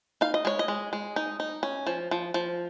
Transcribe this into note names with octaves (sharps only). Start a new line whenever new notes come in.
D#4 F5
D#5
G#3 C#5
D#5
G#3
G#3
D#4
D#4
C#4
F3
F3
F3